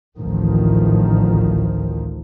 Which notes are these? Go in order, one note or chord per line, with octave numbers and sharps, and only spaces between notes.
A1 D2 D#3 F3